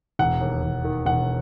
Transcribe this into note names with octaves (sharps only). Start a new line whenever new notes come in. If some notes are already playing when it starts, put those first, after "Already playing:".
E1 F#5
D#2
E1
D#3
E1 F#5